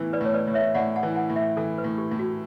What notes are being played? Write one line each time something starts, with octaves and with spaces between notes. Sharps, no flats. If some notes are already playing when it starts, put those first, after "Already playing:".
Already playing: A2 E3 B3
B4 D5
A2 C#5
B4 D5
A2
C#5 E5
A2 D5 F#5
F#5 A5
E3
F#5 A5
A2
E5 G5
E3 A4
B4
A2
G4
A2
F#4